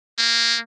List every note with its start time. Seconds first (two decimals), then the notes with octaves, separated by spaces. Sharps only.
0.18 A#3